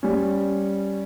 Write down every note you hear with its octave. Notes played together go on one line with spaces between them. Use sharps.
G3 C#4